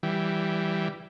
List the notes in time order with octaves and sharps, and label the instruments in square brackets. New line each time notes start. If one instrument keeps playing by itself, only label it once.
[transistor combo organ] E3 G3